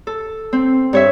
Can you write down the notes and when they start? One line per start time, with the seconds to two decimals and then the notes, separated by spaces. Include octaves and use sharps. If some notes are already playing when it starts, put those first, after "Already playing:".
0.07 A4
0.53 C4
0.93 G2 C#5 E5